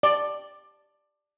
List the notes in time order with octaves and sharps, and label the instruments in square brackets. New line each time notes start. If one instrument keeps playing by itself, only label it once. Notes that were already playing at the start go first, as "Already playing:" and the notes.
[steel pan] D5